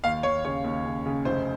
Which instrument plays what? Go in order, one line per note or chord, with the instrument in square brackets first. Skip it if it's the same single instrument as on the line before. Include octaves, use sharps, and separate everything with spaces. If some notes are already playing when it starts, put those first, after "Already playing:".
[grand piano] D#2 F5
D#2 C#5
C#3 C#5
D#2
C#3
C#3
F1 C5